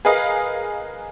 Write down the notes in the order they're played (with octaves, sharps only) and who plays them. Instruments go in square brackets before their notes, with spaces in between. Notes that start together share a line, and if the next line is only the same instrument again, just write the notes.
[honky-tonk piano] G#4 A#4 B4 D#5 F5